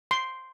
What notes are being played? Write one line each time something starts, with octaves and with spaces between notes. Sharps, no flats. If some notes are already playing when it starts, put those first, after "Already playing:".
C6